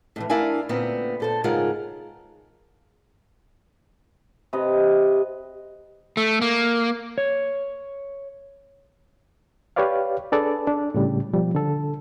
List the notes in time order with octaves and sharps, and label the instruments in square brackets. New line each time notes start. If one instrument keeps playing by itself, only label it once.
[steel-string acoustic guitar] A2 C#3 E3
D4 E4 A#4 F5 G#5
D2 A#2 B3 C4
A#2 A4 C5
G#2 C#3 G#3 F4 A#4 F#5
[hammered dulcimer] C3 B4 D#5
[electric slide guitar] A3
A#3
[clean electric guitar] C#5
[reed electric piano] G4 B4 C#5 D5 F5
D4 G#4 A4 B4 D5
D4
A2 C#3 G3
B2 F3 G3
D3 A4